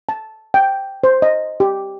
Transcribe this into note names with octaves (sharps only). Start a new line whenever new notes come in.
A5
G5
C5
D#5
G4